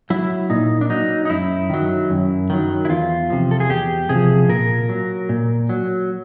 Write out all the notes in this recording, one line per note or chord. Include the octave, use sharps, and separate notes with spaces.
F#3 E4
A#2 D#4
D4
F#3 D#4
D#4
F#2 E4
D#3 F#3
F#2
D#3 F#3
E4
E2 F4
C3 F3
A4
G#4
E2 G4
C3 F3 G#4
A#2 A#4
F#3
A#2
F#3